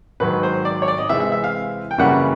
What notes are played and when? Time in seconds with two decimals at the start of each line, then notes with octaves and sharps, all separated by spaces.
0.20 G#2 D#3 F#3 B4
0.43 C5
0.65 D5
0.82 C#5
0.88 D5
0.98 D#5
1.09 C3 E3 G#3 C4 E5
1.20 E5
1.32 E5
1.44 F5
1.91 G5
1.98 F#2 C#3 E3 G3 A#3 F#5